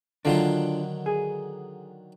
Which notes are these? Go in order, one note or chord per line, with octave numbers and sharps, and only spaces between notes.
D3 D#3 F#3 D4 F4
G#4